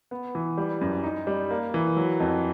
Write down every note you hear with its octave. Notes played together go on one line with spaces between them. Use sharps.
B3
E3
G3
F#2
D#4
G3
A#3
E3
F#3
F2